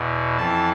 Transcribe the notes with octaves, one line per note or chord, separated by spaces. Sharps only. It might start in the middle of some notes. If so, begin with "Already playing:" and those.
Already playing: E2 B2
F2 E3 A5